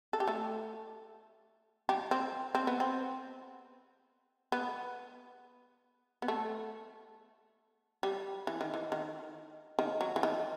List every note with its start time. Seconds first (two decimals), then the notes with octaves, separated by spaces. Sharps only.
0.13 A4
0.20 G4
0.27 A3 A4
1.89 G3 G4
2.11 C4
2.55 C4
2.67 B3
2.80 C4
4.52 B3
6.22 B3
6.28 A3
8.03 G3
8.47 E3
8.61 D#3
8.74 E3
8.92 D#3
9.79 D#3
10.01 F#3
10.16 E3
10.23 D#3